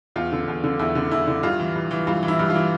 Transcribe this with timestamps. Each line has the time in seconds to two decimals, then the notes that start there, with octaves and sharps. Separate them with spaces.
0.16 E2 F4
0.32 D3
0.48 E2
0.64 D3
0.79 E2 E4
0.95 D3
1.11 E2 E4
1.27 D3
1.43 G2 F4
1.59 E3
1.75 G2
1.91 E3
2.07 G2 F4
2.23 E3
2.28 E4
2.39 G2
2.50 F4
2.55 E3